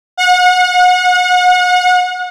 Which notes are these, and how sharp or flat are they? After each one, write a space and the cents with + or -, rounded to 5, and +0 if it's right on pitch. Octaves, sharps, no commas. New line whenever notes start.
F#5 -35